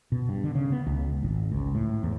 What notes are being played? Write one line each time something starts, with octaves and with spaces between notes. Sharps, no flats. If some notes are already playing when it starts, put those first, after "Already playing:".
B2
G2
D3
C#3
B3
C#2
G#1
C#2
A2
E2